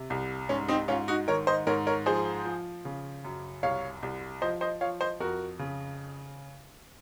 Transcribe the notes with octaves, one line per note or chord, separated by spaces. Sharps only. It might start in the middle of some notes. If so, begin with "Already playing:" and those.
Already playing: C3
C2
G#2 C#4
C4 D#4
G#2 C#4 F4
D#4 F#4
D#3 A#4 C#5
C5 D#5
G#2 A#4 C#5
A#4 C#5
F3 G#4 C5
F3
C#3
F#2
C2 C#5 F5
C2
F3 C5 D#5
C5 D#5
F3 C#5 F5
C5 D#5
F2 F#4 A#4
C#3